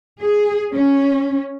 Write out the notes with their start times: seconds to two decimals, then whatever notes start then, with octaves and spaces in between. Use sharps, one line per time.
0.22 G#4
0.72 C#4